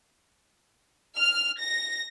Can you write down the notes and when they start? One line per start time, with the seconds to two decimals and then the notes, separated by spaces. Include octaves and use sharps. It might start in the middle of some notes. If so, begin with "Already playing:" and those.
1.17 F6
1.60 A#6